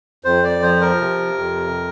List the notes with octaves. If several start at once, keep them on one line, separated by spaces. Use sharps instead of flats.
F2 C5
D5
F3 C5
A#4
C3
F2